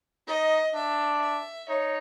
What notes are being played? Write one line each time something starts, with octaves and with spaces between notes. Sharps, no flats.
D#4 D#5
D4 E5
E5
D#4 C#5